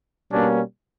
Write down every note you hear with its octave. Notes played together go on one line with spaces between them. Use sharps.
B2 G3 A#3 C#4 D4